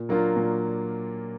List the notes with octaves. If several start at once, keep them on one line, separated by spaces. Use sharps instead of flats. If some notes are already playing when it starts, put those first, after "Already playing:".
Already playing: A#2
F#3 A#3 D4 F4
A#2